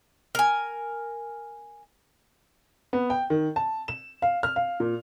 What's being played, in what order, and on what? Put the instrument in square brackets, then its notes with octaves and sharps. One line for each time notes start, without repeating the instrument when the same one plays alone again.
[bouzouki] A#4 G#5
[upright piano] B3
G5
D#3
A5
E7
F5
F6
F5
A#2